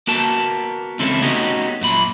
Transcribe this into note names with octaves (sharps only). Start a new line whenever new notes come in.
A#3 B3 F#4 A#4 A5
C#2 E3 C4 C#4 E4 A4
A3 B3 C#4 D#4 F#4 G4
F#2 A#2 B5